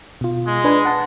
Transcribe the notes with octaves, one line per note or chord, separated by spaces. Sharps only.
B2 F4
G#3
D4 B4 G#5
F#5 A5